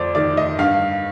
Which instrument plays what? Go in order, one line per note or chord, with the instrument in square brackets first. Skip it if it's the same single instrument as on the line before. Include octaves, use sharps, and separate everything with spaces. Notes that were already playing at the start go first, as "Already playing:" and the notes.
Already playing: [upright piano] F2 C5 D5
D#3 D5
D#5
G2 F5